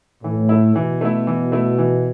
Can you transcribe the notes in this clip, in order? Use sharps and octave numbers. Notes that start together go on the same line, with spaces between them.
A2 E3
A3 E4
B2 E3
A3 E4
E3
A3 E4
E3